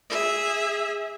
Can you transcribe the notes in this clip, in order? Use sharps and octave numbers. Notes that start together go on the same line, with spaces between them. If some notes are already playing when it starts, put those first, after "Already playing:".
G#4 E5